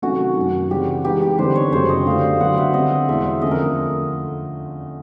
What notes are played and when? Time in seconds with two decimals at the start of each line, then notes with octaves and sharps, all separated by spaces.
0.02 C3 D#3 F#3 A3 C#4 F#4
0.36 F#2 D#3 F#3
0.70 C#3 E3 G3 C4 G4
1.04 E3 G#3 B3 D#4 G4
1.22 G4
1.38 F2 D3 G3 B3 D#4 C5
1.56 C#5
1.72 F#2 C#3 F#3 A3 C5
1.89 D#5
2.06 D3 F#3 A3 D4 F5
2.40 D3 F#3 B3 F#5
2.57 E5
2.74 D3 G3 C4 D#5
3.08 E2 B2 G#3 E5
3.42 F2 D3 F3 A3 C#4 D#5
3.51 A#4